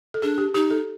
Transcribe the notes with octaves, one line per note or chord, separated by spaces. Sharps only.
A4
D4 G#4
G4
D#4 G4
A4